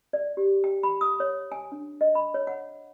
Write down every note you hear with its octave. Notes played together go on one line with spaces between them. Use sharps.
D5
G4
G5
B5
D#6
C#5
G#5
D4
D#5
B5
C#5
F#5